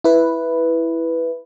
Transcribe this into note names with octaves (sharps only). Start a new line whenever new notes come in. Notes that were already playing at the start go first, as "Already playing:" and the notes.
E4 B4